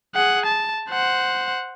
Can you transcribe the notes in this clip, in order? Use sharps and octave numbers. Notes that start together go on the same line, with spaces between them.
G#4 F#5
A5
C5 F#5